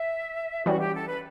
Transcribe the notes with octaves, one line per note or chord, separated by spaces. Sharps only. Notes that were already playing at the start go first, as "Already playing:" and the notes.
Already playing: E5
E3 G3 C#4 F#4
G4
A4
B4